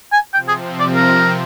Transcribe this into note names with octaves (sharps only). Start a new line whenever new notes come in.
G#5
C3 F3 C4 G5
G#4
D5
A#4